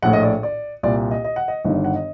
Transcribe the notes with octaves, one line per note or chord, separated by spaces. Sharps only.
A#1 A2 F#5
D#5
D5
D5
C2 A#2 D5
D#5
D#5
F#5
D#5
G1 G2 D#3 D#5
F#5
D#5